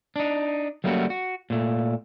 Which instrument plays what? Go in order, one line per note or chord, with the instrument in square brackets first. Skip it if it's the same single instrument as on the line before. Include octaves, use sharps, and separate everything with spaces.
[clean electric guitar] D4 D#4
F#3 G3 A3 A#3 C#4 F#4
F#4
A#2 A3